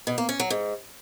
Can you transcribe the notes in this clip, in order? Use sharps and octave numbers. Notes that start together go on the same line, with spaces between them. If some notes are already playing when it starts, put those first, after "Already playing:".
B2
A#3
C#4
F#3
G#2